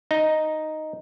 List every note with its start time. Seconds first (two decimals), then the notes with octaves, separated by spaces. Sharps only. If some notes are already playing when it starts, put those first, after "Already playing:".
0.11 D#4